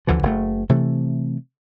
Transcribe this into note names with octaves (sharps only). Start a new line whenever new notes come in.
D2 D3 E3 F3
F#1 A3
C3 E3 A3